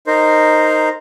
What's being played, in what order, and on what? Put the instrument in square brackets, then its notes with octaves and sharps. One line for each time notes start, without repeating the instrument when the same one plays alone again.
[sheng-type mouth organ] D#4 A#4 C5